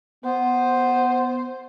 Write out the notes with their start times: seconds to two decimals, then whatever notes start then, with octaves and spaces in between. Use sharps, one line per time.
0.24 B3 C5